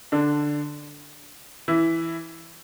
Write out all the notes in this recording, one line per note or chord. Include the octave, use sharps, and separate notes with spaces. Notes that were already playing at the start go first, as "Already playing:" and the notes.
D3 D4
E3 E4